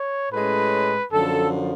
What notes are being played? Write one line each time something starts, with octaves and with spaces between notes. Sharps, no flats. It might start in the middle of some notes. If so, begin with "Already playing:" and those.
Already playing: C#5
A2 G#3 C#4 B4
F#2 D3 F3 A4